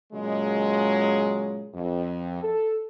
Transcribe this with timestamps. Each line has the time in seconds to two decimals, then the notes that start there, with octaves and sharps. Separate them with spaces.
0.13 A#2 C#3 F#3 G#3
1.75 F2
2.43 A4